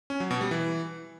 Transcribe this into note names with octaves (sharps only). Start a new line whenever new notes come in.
C#4
F#3
B2
G3
E3